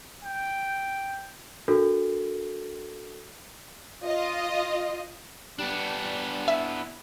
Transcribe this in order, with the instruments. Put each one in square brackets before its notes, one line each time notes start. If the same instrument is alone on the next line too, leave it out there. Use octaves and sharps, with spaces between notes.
[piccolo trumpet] G5
[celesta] D4 F#4 A4 A#4
[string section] F4 D#5
[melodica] G3 [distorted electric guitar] B3 D4
[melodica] E4 [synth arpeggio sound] E5